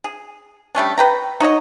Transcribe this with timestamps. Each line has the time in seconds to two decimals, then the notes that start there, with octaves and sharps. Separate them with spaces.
0.04 G#4
0.75 G3 A3 C#4 D4
0.98 B4 G5 A#5
1.40 D#4 F#4 C#5 D#5